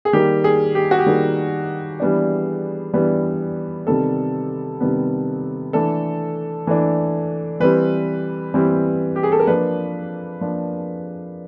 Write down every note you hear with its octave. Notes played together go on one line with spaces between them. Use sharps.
G#4
D#3 G3 A#3 G4
G#4
G4
F#4
G4
D#3 G3 A#3 G#4
E3 G3 B3 D4
E3 G3 B3 D4
C3 D#3 G3 B3 A4
C3 D#3 G3 B3
E3 A3 D4 A4
E3 A3 D4
E3 G3 C4 B4
E3 G3 C4
G4
G#4
A4
A#4
F3 A#3 D4 B4
F3 A#3 D4